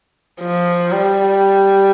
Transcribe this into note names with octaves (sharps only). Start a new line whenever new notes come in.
F3
G3